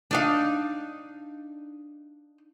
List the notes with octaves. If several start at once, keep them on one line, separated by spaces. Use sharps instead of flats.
D4 D#4 F5